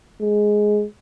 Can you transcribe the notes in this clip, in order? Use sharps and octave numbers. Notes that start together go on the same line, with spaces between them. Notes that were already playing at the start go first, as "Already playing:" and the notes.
G#3